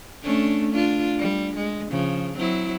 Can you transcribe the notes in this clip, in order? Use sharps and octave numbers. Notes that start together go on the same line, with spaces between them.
A3 C#4 D4
D4 F4
G3
G#3
C#3 F3
F#3 C4 E4